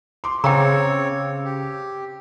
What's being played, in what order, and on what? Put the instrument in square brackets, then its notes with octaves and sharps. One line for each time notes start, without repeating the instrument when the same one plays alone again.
[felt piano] C6 D6
[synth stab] C#3 [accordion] C4 C#5 [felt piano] F5 D6 E6 [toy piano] G5 A#5
[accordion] G4